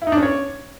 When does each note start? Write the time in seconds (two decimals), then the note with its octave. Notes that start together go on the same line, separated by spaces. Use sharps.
0.02 E4
0.07 D#4
0.12 D4
0.17 C#4
0.23 C#5